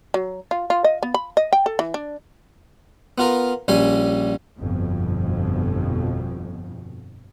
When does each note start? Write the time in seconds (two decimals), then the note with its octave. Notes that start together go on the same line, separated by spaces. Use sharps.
0.14 F#3
0.51 F4
0.70 F4
0.84 D#5
1.03 B3
1.14 B5
1.37 D#5
1.53 G5
1.66 A4
1.79 E3
1.94 D4
3.18 B3 F4 A#4
3.68 A#1 G3 C#4 G#5
4.59 G1 F2 B2